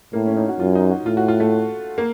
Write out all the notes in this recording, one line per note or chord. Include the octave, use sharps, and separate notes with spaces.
A2 A#3
C#4
D#4
F#4
F#2 F4
D#4
F#4
A2 F4
F#4
F4
A3
A#3